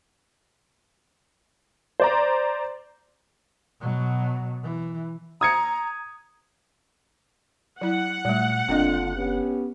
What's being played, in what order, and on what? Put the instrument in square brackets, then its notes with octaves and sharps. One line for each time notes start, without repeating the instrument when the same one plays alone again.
[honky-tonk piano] C5 D5 A#5
[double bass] B2 F#3
E3
[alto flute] A#5 [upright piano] D#6 G#6 C#7
[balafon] F#3 E4 [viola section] F#5
[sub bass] A#2 [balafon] G3 A3
[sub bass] F#1 [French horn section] D3 A#3 F4 [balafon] C4 D4 D#5
[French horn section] B3 C#4 G4